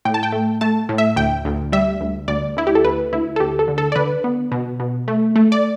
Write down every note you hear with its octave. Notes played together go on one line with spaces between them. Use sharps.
A2 G5
A5
G5
A3
A3 A5
A2
E5
D2 G5
D2
G3 E5
D2
D2 D5
D2 E4
G4
A4
D2 B4
D2 E4
A4
D2 G4
A4
D3
A4
D5
D3 B4
B3
B2
B2
A3
A3
D5